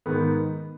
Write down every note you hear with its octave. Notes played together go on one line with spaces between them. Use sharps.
G#2 D#3 B3